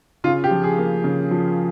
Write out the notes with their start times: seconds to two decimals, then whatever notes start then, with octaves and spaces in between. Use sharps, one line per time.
0.24 C#3 F4
0.44 G4
0.51 F3
0.63 G#4
0.78 A#3
1.04 C#3
1.31 F3